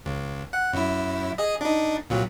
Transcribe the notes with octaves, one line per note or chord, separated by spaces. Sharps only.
C#2
F#5
F#2 E4
G#4 D#5
D4 D#4
C2 A#2 F#3